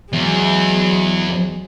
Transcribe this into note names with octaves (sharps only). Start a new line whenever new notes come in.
E2 F#3 G#3